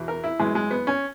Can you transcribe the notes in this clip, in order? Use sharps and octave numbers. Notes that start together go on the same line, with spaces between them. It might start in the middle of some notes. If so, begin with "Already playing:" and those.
Already playing: E2 B2
A#4
E4
F#2 E3 G#3
G#3
B3
C#4